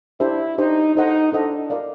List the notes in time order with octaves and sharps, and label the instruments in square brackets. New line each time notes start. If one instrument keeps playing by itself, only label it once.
[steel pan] D4 G4 C5 E5 [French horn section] E4
[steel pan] D4 G4 C5 E5 [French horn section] D#4
[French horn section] D#4 [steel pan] E4 A4 C5 D#5 F#5
[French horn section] D4 [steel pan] E4 A4 C5 D#5 F#5
[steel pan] F#4 A#4 D5 F5